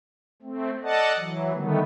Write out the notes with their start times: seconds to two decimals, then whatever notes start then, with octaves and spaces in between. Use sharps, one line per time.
0.42 A3 C4
0.83 A4 D5 D#5 F#5 A5
1.17 E3 F#3
1.53 D3 D#3 G3 A3 B3